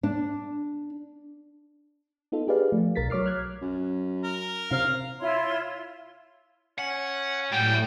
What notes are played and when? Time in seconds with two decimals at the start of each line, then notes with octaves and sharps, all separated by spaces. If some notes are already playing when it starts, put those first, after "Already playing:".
0.03 D4
2.32 B3 D#4 F4 A4
2.47 D4 G4 G#4 B4 D5 F5
2.72 F3 A3
2.96 B1 A#4 A6 B6
3.10 F#3 C#5 D6 F6 C7
3.26 F6 F#6 G#6
3.62 F#2
4.24 A#4
4.71 C3 F5
5.19 E4 F4 C#5 C6
6.78 C#4 F#5
7.52 A2 F#3 G3 G5